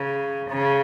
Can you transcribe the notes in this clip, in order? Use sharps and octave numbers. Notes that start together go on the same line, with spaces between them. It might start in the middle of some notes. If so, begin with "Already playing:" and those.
Already playing: C#3
C#3